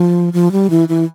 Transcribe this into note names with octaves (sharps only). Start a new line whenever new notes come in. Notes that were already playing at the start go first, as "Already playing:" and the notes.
Already playing: F3
F3
G3
E3
E3